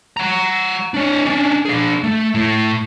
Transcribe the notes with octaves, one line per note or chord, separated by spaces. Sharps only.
F#5 A#5
D4 C#5
C#4 D4
D4 G#4
A3
A2